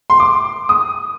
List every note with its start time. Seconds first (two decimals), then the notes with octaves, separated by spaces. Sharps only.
0.10 C6
0.20 D6
0.69 D#6